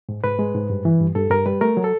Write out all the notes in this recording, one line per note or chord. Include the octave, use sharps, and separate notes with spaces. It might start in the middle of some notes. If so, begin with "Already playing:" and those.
G#2
G#2 B4
G#3
G#2
G2
E3
G2
G2 A4
G2 A#4
G3 B4
A3 A#4
F#3
A4